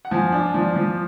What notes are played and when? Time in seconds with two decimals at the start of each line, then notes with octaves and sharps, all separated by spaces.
0.05 F#5
0.11 F3 G#5
0.32 D4
0.54 F3
0.76 F3